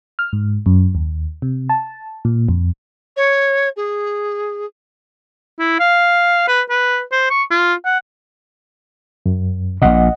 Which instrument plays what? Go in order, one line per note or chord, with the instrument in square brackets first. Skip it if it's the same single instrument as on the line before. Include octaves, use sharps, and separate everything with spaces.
[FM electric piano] F6
G#2
F#2
D#2
C3
A5
A#2
F2
[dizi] C#5
G#4
[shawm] E4
F5
B4
B4
C5
C#6
F4
F#5
[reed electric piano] F#2
[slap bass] A#1 A#2 [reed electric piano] D#5 F#5